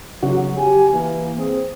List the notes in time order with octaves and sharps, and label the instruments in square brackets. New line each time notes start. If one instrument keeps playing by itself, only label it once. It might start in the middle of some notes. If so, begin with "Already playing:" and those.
[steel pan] C#3 F#4 [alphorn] F#3
[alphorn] G4 [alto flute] G#5
[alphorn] E3 [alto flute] A#3
[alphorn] C4 [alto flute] G#4